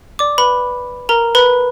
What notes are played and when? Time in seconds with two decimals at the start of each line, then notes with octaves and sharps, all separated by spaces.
0.19 D5 D6
0.38 B4 B5
1.09 A#4 A#5
1.35 B4 B5